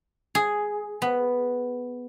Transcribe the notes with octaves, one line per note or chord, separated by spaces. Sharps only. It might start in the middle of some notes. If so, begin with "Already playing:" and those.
G#4
B3